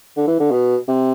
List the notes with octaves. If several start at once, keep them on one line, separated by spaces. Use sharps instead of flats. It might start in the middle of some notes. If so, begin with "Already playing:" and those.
D3
E3
D3
B2
C3